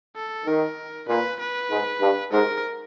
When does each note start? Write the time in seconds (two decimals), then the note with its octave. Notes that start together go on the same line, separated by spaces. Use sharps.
0.16 A4
0.46 D#3 A#4
1.08 A#2 B4
1.40 B4
1.71 G#2
2.01 G2
2.32 G#2 A#4